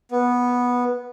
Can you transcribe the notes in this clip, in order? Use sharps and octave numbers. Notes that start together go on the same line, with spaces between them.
B3